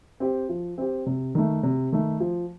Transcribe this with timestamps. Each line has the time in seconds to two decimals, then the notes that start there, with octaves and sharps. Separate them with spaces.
0.20 C4 G4
0.49 F3
0.78 C4 G4
1.06 C3
1.35 D#3 A3
1.63 C3
1.92 D#3 A3
2.20 F3